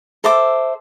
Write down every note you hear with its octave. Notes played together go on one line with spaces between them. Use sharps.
A4 C5 E5 D6